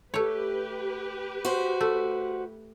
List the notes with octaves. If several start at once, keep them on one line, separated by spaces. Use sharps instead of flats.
A3 G4 B4 C#5
F#4 C5
A3